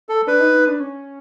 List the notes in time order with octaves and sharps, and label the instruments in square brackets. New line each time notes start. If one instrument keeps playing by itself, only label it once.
[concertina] A4
[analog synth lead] D4 [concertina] B4
[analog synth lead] D#4
D#4
D4
C#4